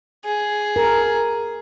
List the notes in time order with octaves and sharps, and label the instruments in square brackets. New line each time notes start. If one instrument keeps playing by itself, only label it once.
[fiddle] G#4
[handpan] A#4